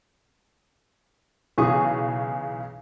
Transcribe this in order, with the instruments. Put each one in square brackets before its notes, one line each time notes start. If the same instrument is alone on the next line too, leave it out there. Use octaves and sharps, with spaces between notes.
[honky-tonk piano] B1 C#3 E3 G#4 C#6 D#6